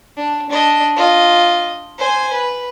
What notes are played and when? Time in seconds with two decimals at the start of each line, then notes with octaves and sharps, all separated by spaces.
0.17 D4
0.50 D4 D#5
0.97 F4 D#5
1.99 C5 G#5
2.33 B4